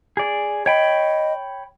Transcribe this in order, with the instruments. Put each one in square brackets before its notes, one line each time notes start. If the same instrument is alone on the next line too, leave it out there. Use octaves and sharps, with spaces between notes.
[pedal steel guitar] G#4 D5
[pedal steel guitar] C#5 G5 B5 [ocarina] D#5